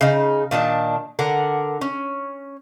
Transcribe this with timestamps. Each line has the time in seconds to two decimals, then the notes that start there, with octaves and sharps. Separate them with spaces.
0.01 C#3 D#4
0.51 A#2 D#3 D4 A5
1.19 D3 A#4 F#5
1.81 C#4